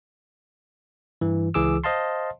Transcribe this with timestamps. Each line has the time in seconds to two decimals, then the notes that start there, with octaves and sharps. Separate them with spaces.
1.21 G2 E3
1.54 C#2 E3 G#4 D6 E6
1.84 C5 D#5 F5 A5 C6